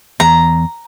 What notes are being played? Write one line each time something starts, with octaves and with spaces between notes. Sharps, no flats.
E2 A#5